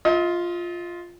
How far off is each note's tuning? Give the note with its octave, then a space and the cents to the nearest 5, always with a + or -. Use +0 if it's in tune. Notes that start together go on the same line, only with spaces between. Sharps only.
F4 +0 D#5 +40